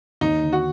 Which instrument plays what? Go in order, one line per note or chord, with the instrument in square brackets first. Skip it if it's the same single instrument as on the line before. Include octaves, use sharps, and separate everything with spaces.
[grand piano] D#2 [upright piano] D#4
[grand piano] D3
[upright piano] F#4